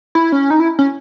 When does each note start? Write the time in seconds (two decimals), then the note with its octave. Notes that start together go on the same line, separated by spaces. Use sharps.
0.15 E4
0.32 C#4
0.50 D#4
0.60 E4
0.79 C#4